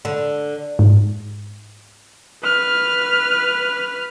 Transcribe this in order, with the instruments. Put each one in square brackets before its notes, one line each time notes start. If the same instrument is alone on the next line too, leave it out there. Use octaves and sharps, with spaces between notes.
[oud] D3
[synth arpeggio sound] G#2
[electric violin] B4 F6